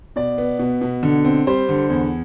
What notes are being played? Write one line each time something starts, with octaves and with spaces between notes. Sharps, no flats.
B2 D5
B3
B2
B2
D3
C4
G3 C5
D3
E2